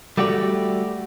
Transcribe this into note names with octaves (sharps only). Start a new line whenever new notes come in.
G3 A3 F#4 G4 D5